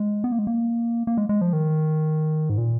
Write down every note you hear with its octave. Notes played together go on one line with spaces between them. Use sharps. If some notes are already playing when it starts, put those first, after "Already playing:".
Already playing: G#3
B3
A#3
G#3
A#3
A#3
G#3
G#3
F3
D#3
G#2
A#2